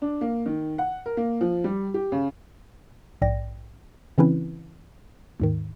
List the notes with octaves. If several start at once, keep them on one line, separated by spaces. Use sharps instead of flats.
D4
A#3
D#3
F#5
A#4
A#3
F3
G3
G4
C#3
A#1 G#2 D5 G5 A#6
C#3 E3 C4 C#4 E4 B4
D#2 G#2 D#3